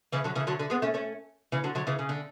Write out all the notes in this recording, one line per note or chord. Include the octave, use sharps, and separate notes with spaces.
C#3 E3
D3 F#3
C#3 E3
D3 F#3
D3
G#3 B3
A3 C#4
A3 C#4
C#3 E3
D3 F#3
D3 F#3
C#3 E3
C#3
D3